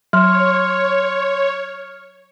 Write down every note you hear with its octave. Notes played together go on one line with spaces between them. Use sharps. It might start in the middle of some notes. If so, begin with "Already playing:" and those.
F#3 C#5 C6 F6